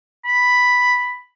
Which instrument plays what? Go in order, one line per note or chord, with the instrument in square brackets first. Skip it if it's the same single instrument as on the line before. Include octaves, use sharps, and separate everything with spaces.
[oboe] B5